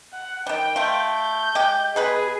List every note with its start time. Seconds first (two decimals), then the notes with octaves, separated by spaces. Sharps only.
0.13 F#5
0.47 D#3 G3 G5
0.76 A3 F4
1.15 G6
1.55 G#3 G4
1.96 B2 G#4 B4 B5